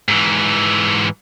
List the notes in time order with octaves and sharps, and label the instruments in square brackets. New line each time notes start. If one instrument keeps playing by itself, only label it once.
[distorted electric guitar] G#2 E3